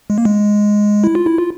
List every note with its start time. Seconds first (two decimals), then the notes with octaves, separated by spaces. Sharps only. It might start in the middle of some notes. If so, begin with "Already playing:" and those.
0.10 G#3
0.18 A#3
0.25 G#3
1.04 E4
1.15 F4
1.26 E4
1.38 F4